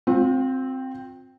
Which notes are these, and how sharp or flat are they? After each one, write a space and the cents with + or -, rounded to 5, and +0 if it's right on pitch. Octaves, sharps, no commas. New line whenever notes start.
C4 +0 F4 +40